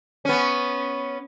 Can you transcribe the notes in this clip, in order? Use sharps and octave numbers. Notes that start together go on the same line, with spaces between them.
B3 C#4